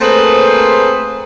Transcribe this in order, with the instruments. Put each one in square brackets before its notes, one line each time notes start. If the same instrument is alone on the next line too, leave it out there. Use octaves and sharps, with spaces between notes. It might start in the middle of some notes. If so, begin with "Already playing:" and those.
[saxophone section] A3 A#3 C4 G#4 B4 C5